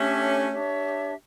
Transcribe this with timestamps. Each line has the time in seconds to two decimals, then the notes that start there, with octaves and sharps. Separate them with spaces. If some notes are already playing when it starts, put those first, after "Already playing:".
Already playing: A3 C#4 D4 G4 C#5 E5
0.51 D4 G4 C#5 E5